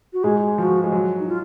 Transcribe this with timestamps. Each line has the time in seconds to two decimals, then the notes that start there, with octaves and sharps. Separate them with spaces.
0.13 F#4
0.23 G#2 G#3 G#4
0.58 F3 F#4
0.84 G#3
0.92 F#3
1.19 D#4
1.28 F4